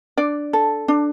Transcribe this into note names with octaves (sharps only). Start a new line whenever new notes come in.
D4 D5
A4
D4